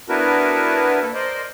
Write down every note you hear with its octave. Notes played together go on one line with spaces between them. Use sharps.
B3 D4 E4 F#4 A#4 B4
A#3 A4
A#4 C5 D5 D#5